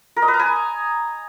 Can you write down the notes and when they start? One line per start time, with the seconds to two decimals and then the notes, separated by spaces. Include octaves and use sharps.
0.16 A#4
0.22 D#5
0.28 B4
0.34 A#5
0.40 G#5